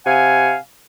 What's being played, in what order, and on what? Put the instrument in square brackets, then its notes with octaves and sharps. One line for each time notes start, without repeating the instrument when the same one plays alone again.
[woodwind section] C3 F5 F#5 G#5